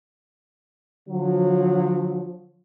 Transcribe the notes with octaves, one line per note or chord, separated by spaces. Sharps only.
D3 F3 F#3